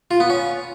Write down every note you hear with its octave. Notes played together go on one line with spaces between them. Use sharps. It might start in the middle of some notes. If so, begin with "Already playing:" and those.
F4
B3
C#4